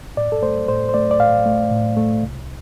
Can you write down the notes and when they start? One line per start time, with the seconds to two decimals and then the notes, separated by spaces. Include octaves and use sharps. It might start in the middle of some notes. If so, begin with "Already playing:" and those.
0.17 A2 D5
0.32 A4
0.42 A3 C5
0.68 A2 C5
0.89 C5
0.94 A3 D5
1.11 D5
1.20 A2 F5
1.46 A3
1.72 A2
1.97 A3
2.23 C2